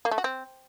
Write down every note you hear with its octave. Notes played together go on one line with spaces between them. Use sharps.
A#3
A3
F#4
C4